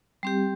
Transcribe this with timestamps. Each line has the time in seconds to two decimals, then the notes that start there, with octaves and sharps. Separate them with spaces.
0.23 G3 C4 G4